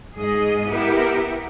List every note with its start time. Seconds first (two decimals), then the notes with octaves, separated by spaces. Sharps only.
0.16 G#2 G#4 D#5
0.69 B3 E4 G4 A#4